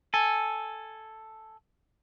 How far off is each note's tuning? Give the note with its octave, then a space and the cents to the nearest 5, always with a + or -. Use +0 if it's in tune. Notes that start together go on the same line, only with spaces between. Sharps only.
A4 +0 G#5 +0